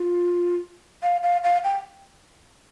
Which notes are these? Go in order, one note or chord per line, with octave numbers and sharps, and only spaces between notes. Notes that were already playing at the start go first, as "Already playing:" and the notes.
Already playing: F4
F5
F5
F5
G5